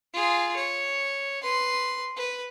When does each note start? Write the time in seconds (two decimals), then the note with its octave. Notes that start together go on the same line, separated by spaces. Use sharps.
0.13 F4 G#4
0.57 C#5
1.43 B4 C6
2.16 B4